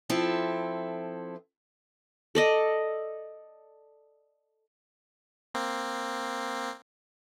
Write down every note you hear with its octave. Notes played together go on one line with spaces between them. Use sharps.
F3 C4 E4 A4
A4 D5 D#5
A#3 C4